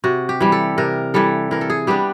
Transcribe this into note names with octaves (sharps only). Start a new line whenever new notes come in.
C3 F#4
G4
E3 G3
A4
C3 A#4
E3 G3 A4
E3 A#4
A4
G#4
G3 B3 D4 G4